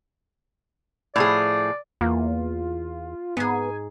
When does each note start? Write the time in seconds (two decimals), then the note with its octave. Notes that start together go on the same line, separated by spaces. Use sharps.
1.16 A2 F3 G#4 D5
2.01 E2 A#3 F4
3.37 G#2 B3 G#4 G#5